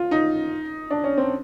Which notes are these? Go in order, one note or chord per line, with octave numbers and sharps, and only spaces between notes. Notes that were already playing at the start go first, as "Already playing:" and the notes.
Already playing: F4
D#4
D4
C#4
C4